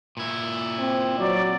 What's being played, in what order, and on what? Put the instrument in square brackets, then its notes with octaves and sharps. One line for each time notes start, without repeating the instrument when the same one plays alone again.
[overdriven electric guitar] A#2 E4
[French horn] C4
[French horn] F#3 [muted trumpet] D5